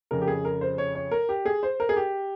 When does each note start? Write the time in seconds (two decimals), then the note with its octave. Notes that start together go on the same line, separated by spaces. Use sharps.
0.11 F2 C#3 A#4
0.21 G4
0.28 G#4
0.45 A#4
0.61 C5
0.78 C#5
0.95 C#5
1.11 A#4
1.29 G4
1.46 G#4
1.63 C5
1.80 A#4
1.89 G#4
1.96 G4